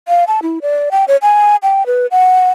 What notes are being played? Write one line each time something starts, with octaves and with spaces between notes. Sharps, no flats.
F5
A5
E4
D5
G5
C#5
G#5
G5
B4
F#5